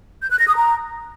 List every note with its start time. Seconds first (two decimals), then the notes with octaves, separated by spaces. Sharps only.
0.22 G6
0.31 F#6
0.39 A#6
0.48 D#6
0.56 A#5